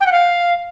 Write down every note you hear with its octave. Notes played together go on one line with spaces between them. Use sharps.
G5
F#5
F5